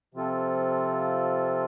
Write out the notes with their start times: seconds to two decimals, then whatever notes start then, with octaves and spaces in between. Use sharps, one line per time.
0.14 C3 F3 C4 F4 A4